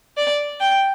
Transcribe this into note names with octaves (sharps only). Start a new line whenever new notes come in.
D5
G5